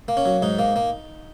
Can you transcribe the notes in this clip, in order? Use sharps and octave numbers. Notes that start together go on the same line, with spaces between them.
A#3
C#4
F#3
G#2 D#4
A#3
A#3